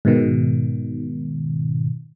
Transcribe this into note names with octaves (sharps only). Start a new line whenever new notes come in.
G#2 B2 D#3